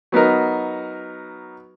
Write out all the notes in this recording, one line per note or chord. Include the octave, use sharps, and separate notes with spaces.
F#3 B3 D#4 A#4